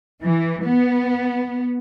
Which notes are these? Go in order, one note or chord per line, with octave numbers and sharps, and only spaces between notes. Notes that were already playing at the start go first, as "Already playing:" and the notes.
E3
B3